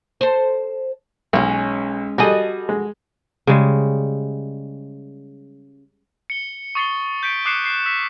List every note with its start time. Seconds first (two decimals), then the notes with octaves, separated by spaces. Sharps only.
0.21 A4 C5
1.33 B1 G#3 C#4
2.18 G3 F#4 G#4 A4 D#5
2.69 G#3
3.47 C#3 G3 G#3
6.30 C#7 G7
6.75 C#6 D#6 A6 C7 C#7 G7
7.23 G6 B6 C#7 D7
7.45 D6 D#6 F#6 C7 C#7 E7
7.66 F#6 C7
7.86 E6 B6